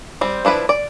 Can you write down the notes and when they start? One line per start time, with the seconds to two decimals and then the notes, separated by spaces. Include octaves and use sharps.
0.21 G3 C4
0.45 F3 D4 E4 B4
0.69 D5